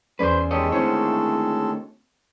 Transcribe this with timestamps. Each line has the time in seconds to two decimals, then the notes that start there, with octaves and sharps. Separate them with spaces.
0.19 E2 C#4 B4 C5 D5
0.51 D#3 G3 G#3 A4 C#5 D#5
0.72 D2 C4 C#4 E4 C#5